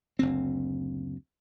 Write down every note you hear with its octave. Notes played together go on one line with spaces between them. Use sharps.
F#1 D2 C4